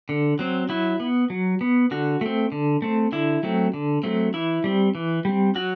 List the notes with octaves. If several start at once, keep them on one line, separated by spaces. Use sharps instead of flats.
D3
F#3 C4
F#3 E4
B3
F#3
B3
D3 F#4
A3 C4
D3
A3 C4
D3 E4
F#3 A3 C4
D3
F#3 A3 C4
E3 E4
G3 C4
E3
G3 C4
F#3 F#4